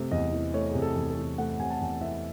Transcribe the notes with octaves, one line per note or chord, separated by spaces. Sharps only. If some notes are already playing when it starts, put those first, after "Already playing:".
Already playing: C3 A3
E2 D#5
E3
A3 C#5
C3 G#4
A4
E2
A4
E3
A3 F#5
C3 G#5
A5
E2 G#5
E3 E5